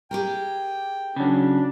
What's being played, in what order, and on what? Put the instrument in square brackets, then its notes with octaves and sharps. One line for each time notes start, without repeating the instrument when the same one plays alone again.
[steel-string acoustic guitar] G4 G#4 A#4 [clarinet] G5
[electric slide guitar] C#3 F#3 [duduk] D4